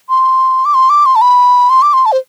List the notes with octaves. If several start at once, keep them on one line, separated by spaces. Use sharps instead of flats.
C6
D6
C6
D6
C6
A5
B5
C6
D6
C6
A5
C5